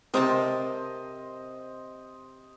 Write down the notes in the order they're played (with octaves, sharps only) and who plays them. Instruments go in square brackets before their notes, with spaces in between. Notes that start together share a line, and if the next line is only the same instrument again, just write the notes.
[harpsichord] C3 [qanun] C4 A#4 A5 [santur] C5 D#5